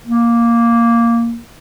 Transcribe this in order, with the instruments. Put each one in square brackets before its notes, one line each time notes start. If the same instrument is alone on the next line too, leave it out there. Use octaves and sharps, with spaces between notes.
[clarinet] A#3